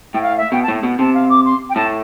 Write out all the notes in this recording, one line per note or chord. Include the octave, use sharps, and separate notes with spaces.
A2 G5
F5
E5
B2 G5
A5
A2
B2
C3 A5
F5
D6
C6
G5
A2 A5